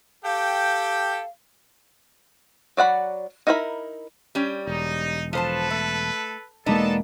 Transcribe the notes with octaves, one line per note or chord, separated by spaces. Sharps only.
G4 A4 F5 G5
F#3 D5 F#5 B5
D#4 E4 A#4 C#5 B5
G3 C#4 G5
E1 D#4
F3 A4 B4 C5 A5
A3
E1 G#3 A#3 B3 D4 D#4 A4 A5